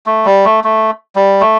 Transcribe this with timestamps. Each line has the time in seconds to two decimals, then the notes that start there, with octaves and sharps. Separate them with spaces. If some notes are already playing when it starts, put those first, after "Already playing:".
0.06 A3
0.25 G3
0.45 A3
0.64 A3
1.16 G3
1.41 A3